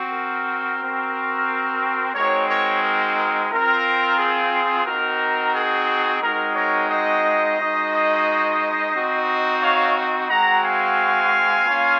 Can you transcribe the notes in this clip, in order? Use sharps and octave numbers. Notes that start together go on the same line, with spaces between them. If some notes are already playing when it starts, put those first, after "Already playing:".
Already playing: C4 F#4
A#4
C4 F#4
G#3 C4 D#4 F#4 A#4 C#5
A#4 C#5
A#4
A#4
C4 F4 A#4
G#4
C4 D#4 F#4 A#4
G#4
G#3 C4 D#4 F#4 A#4
A#4 C#5
C5 D#5
G#3 D#4 F#4
C4 D#4 F#4
C#5 F5
G#3 C4 F#4 F#5 A#5
F5 G#5
A#3 C#4 F4